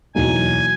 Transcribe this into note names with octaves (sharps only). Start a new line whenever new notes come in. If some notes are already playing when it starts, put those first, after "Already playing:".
E2 B2 F#3 A#3 D#4 G#5